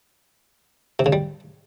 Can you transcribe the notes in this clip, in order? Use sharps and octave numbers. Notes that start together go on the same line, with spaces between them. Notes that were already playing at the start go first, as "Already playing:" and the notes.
C3
C#3
G3